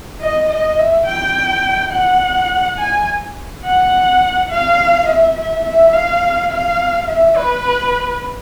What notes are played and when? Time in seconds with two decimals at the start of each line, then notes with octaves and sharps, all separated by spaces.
0.21 D#5
0.49 D#5
0.78 E5
1.06 G5
1.92 F#5
2.78 G#5
3.64 F#5
4.50 F5
5.07 E5
5.36 E5
5.65 E5
5.93 F5
6.51 F5
7.08 E5
7.36 B4